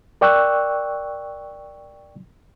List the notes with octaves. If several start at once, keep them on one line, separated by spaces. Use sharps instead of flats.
A#4 D5 G5 C#6 E6 F#6